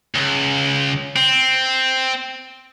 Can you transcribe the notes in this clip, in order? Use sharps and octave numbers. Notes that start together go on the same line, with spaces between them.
C#2
C4